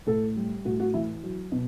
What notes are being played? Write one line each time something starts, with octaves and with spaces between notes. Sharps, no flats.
A2 A4
G3
A2 F#4
F#4
E3 E4
F#3
B2